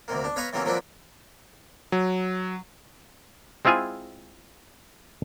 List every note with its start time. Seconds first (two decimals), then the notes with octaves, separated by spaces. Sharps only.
0.08 D2 C3 A#3
0.24 D4
0.36 B4 C#5 D#5 F5 A#5 C#6
0.53 C3 D#3 E3 F#3 A#3 C#4
0.65 F3 F#3 A#3 C4 D4 B4
1.92 F#3
3.65 G#3 C4 E4 F4 G#4 G#5